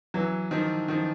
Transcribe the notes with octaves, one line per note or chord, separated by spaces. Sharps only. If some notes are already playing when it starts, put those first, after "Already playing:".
E3 F#3
D#3 F3
D#3 F3